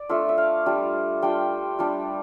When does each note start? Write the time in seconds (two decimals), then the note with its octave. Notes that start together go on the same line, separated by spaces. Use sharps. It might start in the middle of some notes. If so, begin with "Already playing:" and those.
Already playing: D5
0.09 A3 D4 F4 E5
0.29 E5
0.38 F5
0.66 G3 D4 F4
1.22 G3 D4 F4 G5
1.79 G3 D4 F4